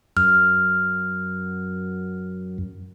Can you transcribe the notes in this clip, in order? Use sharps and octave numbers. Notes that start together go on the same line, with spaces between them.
F#2 F6